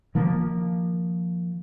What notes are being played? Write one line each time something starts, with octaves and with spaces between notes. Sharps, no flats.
D#3 F3 A#3